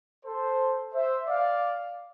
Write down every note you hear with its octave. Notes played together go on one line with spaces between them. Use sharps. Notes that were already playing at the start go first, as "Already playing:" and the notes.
A4 C5
C5 E5
D5 F5